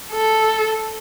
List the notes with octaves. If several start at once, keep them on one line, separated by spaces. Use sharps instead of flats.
A4